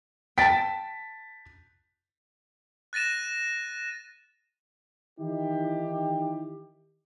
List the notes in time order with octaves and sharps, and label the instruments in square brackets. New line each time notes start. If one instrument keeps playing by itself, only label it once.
[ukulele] G5 A5 [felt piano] A6 B6
[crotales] F#6 A6 A#6 D#7 E7
[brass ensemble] D#3 E3 D#4 E4 G4